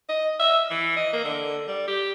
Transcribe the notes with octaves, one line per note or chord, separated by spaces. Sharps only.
D#5
E5
E3
D#5
A#3
D3
G3
G4